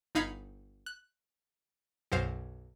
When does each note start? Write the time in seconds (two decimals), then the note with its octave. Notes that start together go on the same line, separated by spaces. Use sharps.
0.15 G1 D#4 F5 B5 G#6 C#7
0.86 F#6
2.12 B1 F#2 C5 F5